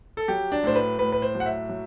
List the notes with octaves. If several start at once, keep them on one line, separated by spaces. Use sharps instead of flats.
A4
F#3 G4
D4
A2 C5
B4
A2 B4
B4
C5
F#3
F#5
E5
F#3